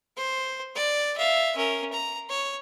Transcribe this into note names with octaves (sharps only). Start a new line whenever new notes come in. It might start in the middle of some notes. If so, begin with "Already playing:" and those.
C5
D5
E5 F5
C#4 A#4
A#5
C#5